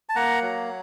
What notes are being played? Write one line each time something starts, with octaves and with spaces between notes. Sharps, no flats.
A5
A#3 F#5 A#5
F#3